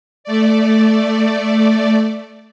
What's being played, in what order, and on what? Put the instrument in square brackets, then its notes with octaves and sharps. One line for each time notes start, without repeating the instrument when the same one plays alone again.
[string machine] A3 D5